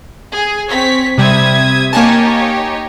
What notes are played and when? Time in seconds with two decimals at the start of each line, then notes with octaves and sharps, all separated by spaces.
0.34 G#4
0.69 C4 C#5 B6
1.18 C3 G3 E5 D#6 G#6
1.93 A#3 D#4 G4 C#5 G#5 A5